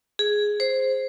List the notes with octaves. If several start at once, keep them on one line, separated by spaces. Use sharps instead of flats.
G#4
C5